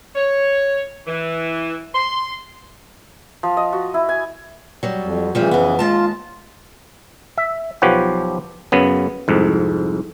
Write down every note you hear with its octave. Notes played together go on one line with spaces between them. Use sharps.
C#5
E3
C6
F3
D#5
F#4
E4
G#5
F#3 G3
F2
C#3 E3 F3 G3 A3
F2 B3
D#2 G#3 F4 A5
E5
B1 F3 G4 B4 C#5 F#5
F#2 C#3 B3
C2 F2 G#2